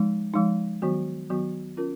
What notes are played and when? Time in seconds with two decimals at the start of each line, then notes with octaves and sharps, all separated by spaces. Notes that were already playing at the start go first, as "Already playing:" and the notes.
Already playing: F3 G#3 D#4
0.34 F3 G#3 D#4
0.82 D#3 F#3 B3 F#4
1.30 D#3 F#3 B3 F#4
1.77 C#4 F4 A#4